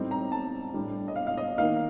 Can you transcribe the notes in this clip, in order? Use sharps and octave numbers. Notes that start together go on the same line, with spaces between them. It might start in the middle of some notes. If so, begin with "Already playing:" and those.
Already playing: A2 G3 C4 D#4
A#5
A5
A2 G3 D4
D#5
F5
F5
D#5
D#3 A#3 D#4 F5